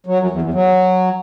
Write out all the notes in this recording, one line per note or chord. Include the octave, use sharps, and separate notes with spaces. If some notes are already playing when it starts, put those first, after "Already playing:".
F#3
F#2
E2
E2
F#3